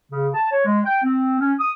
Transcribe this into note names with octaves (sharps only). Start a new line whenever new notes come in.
C#3
A5
C#5
G#3
G5
C4
C#4
D#6